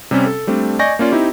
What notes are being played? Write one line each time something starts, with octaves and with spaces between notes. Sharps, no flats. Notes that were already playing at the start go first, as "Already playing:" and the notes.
C3 G3 C4 C#4
A4
G3 A3 C4 D4
D5 D#5 G#5 C#6 G6 A#6
A#3 C#4 F4 D5
C4 D#4 E4 G4